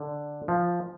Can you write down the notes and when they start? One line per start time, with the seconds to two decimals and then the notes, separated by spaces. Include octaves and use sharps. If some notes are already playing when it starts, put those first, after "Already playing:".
Already playing: D3
0.48 F3